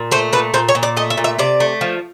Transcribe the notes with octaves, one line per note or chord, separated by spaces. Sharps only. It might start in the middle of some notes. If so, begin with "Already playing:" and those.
Already playing: A#2
A3 C5
A#2 B4
A#2 C5
C#5
A#2
D5
A3 D#5
E5
A#2
E5
C3 D5
A3
F3